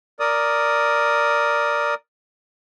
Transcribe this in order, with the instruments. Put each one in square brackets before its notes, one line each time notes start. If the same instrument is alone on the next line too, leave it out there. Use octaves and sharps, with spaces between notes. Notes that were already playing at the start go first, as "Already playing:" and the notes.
[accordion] A#4 D5 D#6